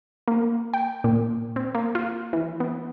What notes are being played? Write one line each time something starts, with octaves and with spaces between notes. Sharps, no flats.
A#3
G5
A#2
C4
A#3
F4
E3
B3